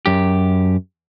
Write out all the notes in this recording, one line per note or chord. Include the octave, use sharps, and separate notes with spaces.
F#2 G4